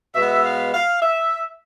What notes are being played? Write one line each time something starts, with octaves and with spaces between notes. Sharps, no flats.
B2 G#3 B3 E5
F5
F5
E5